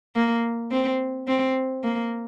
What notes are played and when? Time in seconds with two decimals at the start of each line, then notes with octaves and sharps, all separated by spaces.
0.16 A#3
0.72 C4
1.27 C4
1.83 A#3